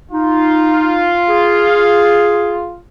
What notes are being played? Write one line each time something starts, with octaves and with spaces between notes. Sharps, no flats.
D#4 F4
G#4